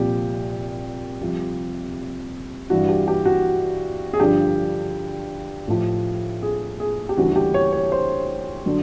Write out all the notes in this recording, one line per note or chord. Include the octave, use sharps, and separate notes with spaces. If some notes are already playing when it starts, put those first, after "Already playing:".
Already playing: C2 A#2 F3 G4
C2 C3 F3
G2 E3 G3 F#4
G4
G4
F#4
G#4
G2 D3 F3 G4
A2 F3
G#4
G#4
G4
D2 C#3 E3 G3 F#4
F#4
G4
C#5
C#5
C5
D3 F#3